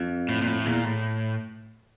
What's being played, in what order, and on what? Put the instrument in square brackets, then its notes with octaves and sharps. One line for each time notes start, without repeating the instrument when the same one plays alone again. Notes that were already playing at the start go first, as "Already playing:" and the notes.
Already playing: [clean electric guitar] F2
[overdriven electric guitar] A2
A#2
A2
[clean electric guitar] E2 [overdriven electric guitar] A#2
[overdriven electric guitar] A2